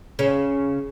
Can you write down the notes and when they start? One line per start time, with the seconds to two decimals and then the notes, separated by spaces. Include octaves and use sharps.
0.19 C#3 C#4